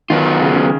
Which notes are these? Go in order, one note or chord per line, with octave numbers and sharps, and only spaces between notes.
D#3 F#3 B3 F4
C#3
C#3